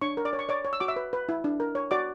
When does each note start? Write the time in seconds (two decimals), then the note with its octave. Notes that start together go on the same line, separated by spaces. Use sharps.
0.01 D4 C#5 C#6
0.17 A#4
0.25 D5 D6
0.33 C#5
0.39 C#6
0.49 C#5 D5 D6
0.65 C#5
0.73 E6
0.80 F#4 D6
0.88 E5 E6
0.96 B4
1.13 B4
1.29 E4
1.44 D4
1.60 A#4
1.75 C#5
1.91 F#4 D5 D6